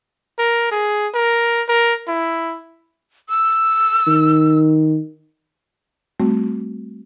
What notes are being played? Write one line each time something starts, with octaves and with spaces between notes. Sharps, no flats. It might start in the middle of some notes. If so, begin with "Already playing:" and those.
A#4
G#4
A#4
A#4
E4
E6
D#3
G3 A3 C4 F#4